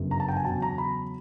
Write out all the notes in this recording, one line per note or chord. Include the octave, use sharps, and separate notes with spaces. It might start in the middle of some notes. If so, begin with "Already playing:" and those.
Already playing: G1 F#2 C#3
A#5
A5
G5
G#5
E2 C#3 F#3 A5
A#5
B5